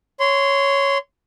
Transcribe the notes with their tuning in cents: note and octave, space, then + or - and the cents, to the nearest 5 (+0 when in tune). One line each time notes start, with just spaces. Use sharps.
C#5 +0 C6 -15